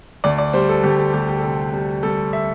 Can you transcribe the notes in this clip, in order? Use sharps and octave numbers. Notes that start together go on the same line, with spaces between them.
D2 D5
D5
G3 C5
A4
D2 G4
A4
D2 G4
G4
A4
C3 G4
G3
G3 A4
E5